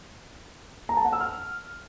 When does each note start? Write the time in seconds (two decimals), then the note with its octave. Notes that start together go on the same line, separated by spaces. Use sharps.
0.89 A#5
0.97 A5
1.05 F#5
1.12 E6
1.20 F6